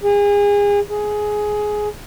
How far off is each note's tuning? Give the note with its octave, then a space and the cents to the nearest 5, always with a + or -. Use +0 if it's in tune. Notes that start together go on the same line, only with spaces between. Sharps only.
G#4 -30
G#4 +10